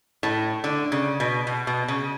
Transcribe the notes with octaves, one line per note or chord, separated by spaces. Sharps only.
A2
D3
C#3
B2
B2
B2
C#3